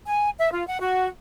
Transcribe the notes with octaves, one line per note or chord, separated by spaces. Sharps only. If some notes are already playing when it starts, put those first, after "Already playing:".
G#5
E5
F4
F#5
F#4